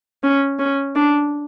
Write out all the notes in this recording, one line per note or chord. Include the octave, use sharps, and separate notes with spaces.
C#4
C#4
D4